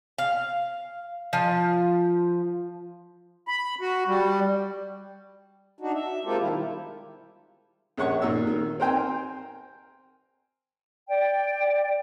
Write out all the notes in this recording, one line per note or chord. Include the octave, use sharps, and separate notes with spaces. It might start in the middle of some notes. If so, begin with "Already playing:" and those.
F5
F3
B5
F#4
G3
D4 D#4 F#4
E5
G#3 A#3 C4 F4 G4 A4
B2 D#3 G3 E4 F4
A#1 C#4 F#5 C#6
A#2 D#4 E6
D#3
C4 A#4 C5 G5 G#5
D5 G5